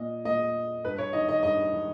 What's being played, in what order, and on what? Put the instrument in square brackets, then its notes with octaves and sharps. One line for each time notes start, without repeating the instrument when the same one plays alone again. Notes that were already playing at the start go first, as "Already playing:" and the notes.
Already playing: [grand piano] A#2 D#5
A#2 D#5
G2 B4
C#5
D#3 D#5
D#5
G2 D#5
D#3